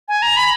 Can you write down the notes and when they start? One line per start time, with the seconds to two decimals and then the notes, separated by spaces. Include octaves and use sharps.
0.08 G#5
0.22 A#5
0.36 B5